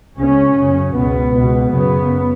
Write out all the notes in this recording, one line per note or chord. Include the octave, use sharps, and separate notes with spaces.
C#2 C#3 C#4
F#2 C#3
C#2 B2 B3
C#2 B2
F#2 C#3 B3